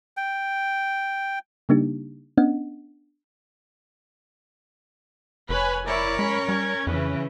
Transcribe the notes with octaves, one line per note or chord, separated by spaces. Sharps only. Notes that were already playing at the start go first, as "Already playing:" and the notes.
G5
C#3 G3 A#3 D4 D#4 G4
B3 C#4 D4 D#5 F#5
F1 B4 C#5 G#5
E4 A#4 C#5 D5
G#3 C#4 B5
G3 G#6
F2 C#3 E3 B4